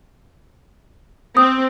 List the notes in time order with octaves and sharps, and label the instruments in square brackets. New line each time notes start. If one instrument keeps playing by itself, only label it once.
[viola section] C4 [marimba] D#6